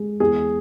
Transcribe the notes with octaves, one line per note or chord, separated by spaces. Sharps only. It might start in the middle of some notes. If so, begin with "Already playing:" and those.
Already playing: G#3
E2 G#4